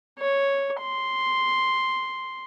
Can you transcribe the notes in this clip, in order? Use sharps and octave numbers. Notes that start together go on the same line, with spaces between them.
C#5
C6